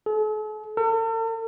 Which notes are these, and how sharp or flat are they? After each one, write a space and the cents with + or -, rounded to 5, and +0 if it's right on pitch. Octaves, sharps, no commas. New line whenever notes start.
A4 -45
A4 +45